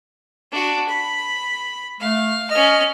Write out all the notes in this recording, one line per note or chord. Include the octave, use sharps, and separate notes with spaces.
D4 F#4
B5
A3 F5
C#4 D#5 F6